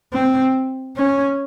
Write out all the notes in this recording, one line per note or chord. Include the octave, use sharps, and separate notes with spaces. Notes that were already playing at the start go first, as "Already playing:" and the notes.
C4
C#4